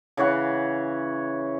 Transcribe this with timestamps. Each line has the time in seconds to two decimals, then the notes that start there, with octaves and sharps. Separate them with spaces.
0.17 C#3 E3 C#5 F#5